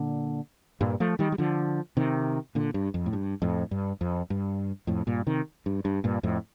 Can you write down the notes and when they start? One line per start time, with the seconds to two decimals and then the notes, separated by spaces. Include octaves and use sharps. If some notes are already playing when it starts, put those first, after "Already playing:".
Already playing: A#2 D3
0.81 G2 A#2
1.00 F3 A3
1.19 D#3 G3
1.32 G3
1.38 D3 F3
1.97 C3 D#3
2.55 A#2 D3
2.74 G2
2.94 F2
3.06 A2
3.13 G2
3.42 F2 A2
3.71 G2
4.01 F2
4.30 G2
4.87 F2 A2
5.07 G2 A#2
5.27 C3 D#3
5.66 G2
5.85 G2
6.04 G2 A#2
6.23 F2 A2